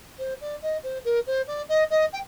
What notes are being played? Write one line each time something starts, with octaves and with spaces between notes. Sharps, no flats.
C5
D5
D#5
C5
A#4
C5
D5
D#5
D#5
G5